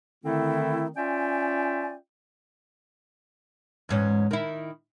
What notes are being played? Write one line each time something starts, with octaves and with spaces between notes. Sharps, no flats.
D3 D#3 A3 C4 E4
C#4 F4 D5 E5 G5 G#5
E2 G#2 C#4
D#3 E4